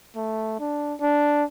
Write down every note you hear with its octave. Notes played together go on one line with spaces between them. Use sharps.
A3
D4
D4